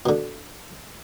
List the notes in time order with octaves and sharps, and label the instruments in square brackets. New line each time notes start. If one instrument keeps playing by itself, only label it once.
[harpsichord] B2 D3